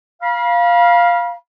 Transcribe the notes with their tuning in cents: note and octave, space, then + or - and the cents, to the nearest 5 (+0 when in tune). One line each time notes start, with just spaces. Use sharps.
F5 +0 B5 -40